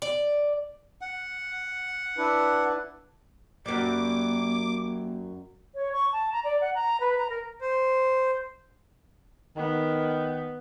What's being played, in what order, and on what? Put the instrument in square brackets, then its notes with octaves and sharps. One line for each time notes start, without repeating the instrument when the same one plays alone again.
[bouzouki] D5
[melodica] F#5
[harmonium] D4 E4 B4
[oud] F#2 G3 [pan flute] A#3 [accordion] D6
[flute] C#5
C#6
A5
A#5
D5
F#5
A#5
B4
A#5
A#4
[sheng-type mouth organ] C5
[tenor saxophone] D#3 [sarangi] B3